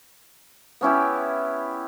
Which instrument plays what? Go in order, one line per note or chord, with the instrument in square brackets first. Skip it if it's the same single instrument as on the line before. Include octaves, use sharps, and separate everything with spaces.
[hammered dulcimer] B3 C#4 E4 G4